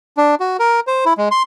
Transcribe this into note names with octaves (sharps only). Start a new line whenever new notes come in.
D4
F#4
A#4
C5
E4
G#3
C6